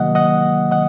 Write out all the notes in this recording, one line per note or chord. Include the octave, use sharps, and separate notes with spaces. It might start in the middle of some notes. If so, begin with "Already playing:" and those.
Already playing: C3 D#3 F#3 A#3 D#5 F#5
D#5 F#5
D#5 F#5